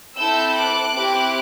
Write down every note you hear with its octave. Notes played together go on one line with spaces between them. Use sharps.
C4 E4 A4 E6 G6
D6 F#6
C4 E4 G4